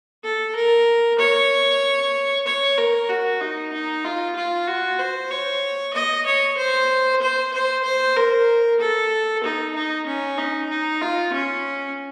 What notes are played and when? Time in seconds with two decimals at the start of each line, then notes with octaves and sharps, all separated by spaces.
0.24 A4
0.55 A#4
1.19 C#5
2.46 C#5
2.78 A#4
3.09 F#4
3.41 D#4
3.73 D#4
4.04 F4
4.36 F4
4.68 F#4
4.99 C5
5.31 C#5
5.94 D#5
6.26 C#5
6.57 C5
7.22 C5
7.53 C5
7.84 C5
8.16 A#4
8.80 A4
9.44 D#4
9.75 D#4
10.07 C#4
10.38 D#4
10.70 D#4
11.01 F4
11.33 C#4